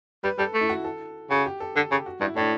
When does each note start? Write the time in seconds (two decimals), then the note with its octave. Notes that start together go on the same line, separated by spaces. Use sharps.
0.24 G3 B4
0.39 G3 A4
0.54 A3
0.61 E4
0.70 F#4
0.84 A4
1.30 C#3 F#4
1.46 G4
1.60 A4
1.76 D3 A4
1.91 C#3 G4
2.06 F#4
2.21 G2 E4
2.36 A2 D4